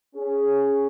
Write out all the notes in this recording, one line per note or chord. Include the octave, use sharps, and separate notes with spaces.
C#4 G#4